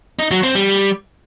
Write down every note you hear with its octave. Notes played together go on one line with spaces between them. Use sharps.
D#4
F#3
C4
G3